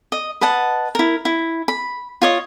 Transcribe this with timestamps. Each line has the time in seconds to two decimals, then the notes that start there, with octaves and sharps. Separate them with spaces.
0.12 D#5
0.41 B4 D#5 F#5 A5
0.95 E4 A#4
1.25 E4
1.68 B5
2.22 F4 C#5 D#5